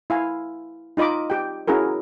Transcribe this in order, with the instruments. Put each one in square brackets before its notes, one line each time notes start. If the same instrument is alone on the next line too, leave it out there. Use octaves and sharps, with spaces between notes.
[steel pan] E4 F5 G#5
D#4 F4 D#5 B5 D6
G4 G5
C#4 E4 F#4 G#4 A#4